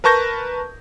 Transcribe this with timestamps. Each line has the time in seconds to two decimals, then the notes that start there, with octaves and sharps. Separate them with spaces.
0.04 A#4 B4 A5 C#6 G6 A#6